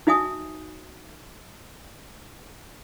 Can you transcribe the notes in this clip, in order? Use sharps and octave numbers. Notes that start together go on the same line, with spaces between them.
D#4 F#4 E5 G#5 D#6